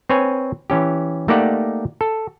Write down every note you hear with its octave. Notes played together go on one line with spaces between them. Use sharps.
C4 B4 C#5 G#5
E3 C#4 G4
A3 A#3 D#4 G4 D5 F#5
A4